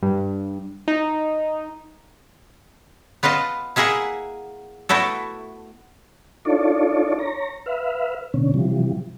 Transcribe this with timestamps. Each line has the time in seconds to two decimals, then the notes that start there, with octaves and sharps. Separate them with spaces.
0.02 G2
0.88 D#4
3.23 B3 F4 B4 D#5 A5
3.76 A#3 E4 G#4 D#5 E5 F#5
4.89 A3 B3 E4 F#4 A4
6.45 D4 D#4 F4 A4 C#5 D5
7.19 C#5 A#5
7.66 B4 E5 F5
8.34 B2 D3 C#4
8.54 C3 E3 F3 G3